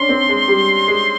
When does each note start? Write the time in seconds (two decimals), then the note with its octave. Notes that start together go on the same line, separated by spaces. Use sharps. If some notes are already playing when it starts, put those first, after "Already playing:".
Already playing: C#4 D4 C6
0.09 C4
0.29 G#3
0.48 G3
0.88 G#3